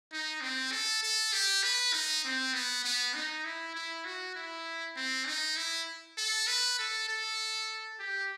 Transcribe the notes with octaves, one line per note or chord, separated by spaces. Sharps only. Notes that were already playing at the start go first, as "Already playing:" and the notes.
D#4
C4
A4
A4
G4
B4
D#4
C4
B3
B3
D#4
E4
E4
F#4
E4
C4
D#4
E4
A4
B4
A4
A4
G4